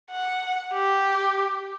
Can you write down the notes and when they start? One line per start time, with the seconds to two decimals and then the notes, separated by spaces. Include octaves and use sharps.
0.11 F#5
0.73 G4